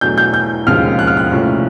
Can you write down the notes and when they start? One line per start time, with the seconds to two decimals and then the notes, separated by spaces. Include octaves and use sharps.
0.01 E2 B2 F#3 A3 D4 G6
0.18 G6
0.34 G6
0.67 E1 D#2 C#3 F3 G#3 F6
0.99 F#6
1.07 F6
1.17 F#6
1.32 C2 A#2 F3 A3 C#4